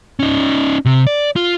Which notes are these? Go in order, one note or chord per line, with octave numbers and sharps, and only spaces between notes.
C#4 D#4
C3
D5
F4